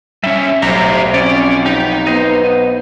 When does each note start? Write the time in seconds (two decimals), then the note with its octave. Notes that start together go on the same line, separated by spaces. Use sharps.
0.24 G3 C#4 E5
0.62 B1 A2 G4 C5 E5 A#5
1.14 F3 C4 C#4 D5
1.66 B3 D#4 G4
2.07 B3 C5 D#5